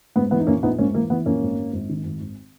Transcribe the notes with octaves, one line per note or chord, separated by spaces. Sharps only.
G#2 B3
E3 B3
D#4
A#1 A#3 C#4
A#1 B3 D#4
G#2 A#3 C#4
E3 A#3
E3 B3
A#1 A#3 C#4
G#1
G#1
G#1
D#3
G#1
G#1